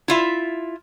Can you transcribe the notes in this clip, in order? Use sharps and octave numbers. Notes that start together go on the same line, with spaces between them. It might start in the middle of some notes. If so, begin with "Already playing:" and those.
E4 F4 E5